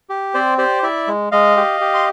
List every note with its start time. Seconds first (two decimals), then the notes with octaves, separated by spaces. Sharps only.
0.10 G4
0.34 C4 C5 D5
0.58 G4 C5 D5
0.83 E4 D5 E5
1.07 G#3
1.32 G#3 D#5 F5
1.57 G4
1.81 G4
1.94 C6